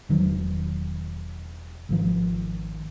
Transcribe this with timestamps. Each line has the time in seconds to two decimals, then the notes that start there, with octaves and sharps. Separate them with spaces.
0.09 E1 D#3 F#3
1.89 G#1 D#3 F3